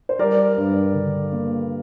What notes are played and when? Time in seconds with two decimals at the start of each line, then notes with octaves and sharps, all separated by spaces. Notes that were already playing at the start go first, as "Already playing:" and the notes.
0.09 C5
0.19 G3 A#4 D5
0.57 G2
0.94 D3
1.32 A#3